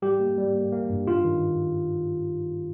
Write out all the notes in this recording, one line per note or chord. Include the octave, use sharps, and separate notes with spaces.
G3 G4
A#3
G3
A#3
A#3
G2
G2 F4
D#3